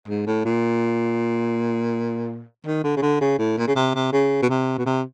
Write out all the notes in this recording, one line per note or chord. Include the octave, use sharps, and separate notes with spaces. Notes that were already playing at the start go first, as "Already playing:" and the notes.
G#2
A2
A#2
D#3
D3
C#3
D3
C#3
A2
A#2
C#3
C3
C3
C#3
B2
C3
B2
C3